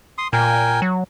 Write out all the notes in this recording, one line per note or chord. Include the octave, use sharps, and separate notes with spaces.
C6 D#6
A#2 A#4 G5 G#5
F#3